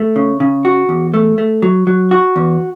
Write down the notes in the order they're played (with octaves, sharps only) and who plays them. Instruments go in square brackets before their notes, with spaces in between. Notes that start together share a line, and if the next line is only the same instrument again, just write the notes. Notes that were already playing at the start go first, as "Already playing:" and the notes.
Already playing: [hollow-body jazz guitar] A3
C#3
C#3
F#4
E2
A3
A3
F#3
F#3
F#4
E2